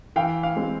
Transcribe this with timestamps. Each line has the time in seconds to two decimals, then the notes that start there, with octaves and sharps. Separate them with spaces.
0.16 E3 F5 G5
0.43 F5
0.56 G#3 C4